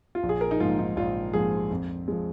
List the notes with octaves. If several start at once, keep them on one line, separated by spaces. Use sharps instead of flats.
F4
A#1
G#4
A#4
D#4
G#2 F3 A#3 F4
D#4
A#1 F4
G#2 F3 A#3 G#4
F2
F3 G#3